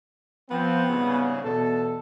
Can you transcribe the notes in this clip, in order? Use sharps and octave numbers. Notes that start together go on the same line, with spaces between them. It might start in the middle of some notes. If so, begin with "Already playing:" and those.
F3 B3 C4
C2 G#2 C#3
E2 B2 A4